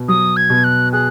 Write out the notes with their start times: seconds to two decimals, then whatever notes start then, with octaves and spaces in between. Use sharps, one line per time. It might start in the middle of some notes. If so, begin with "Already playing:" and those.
Already playing: B2
0.08 F#3 D#6
0.37 G#6
0.50 B2
0.64 F#6
0.93 G#4 F#6